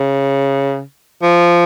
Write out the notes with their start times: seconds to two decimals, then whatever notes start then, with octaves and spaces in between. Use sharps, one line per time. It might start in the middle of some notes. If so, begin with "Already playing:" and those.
Already playing: C#3
1.23 F3